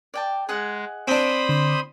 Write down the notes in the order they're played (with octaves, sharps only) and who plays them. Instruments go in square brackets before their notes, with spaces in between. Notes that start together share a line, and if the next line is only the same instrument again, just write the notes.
[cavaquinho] D5 G5 A5
[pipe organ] G#3 [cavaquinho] G#4 D#5 F#5
[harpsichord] C4 D4 [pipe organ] C5 B5 D#6
[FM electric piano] D3 C6 D6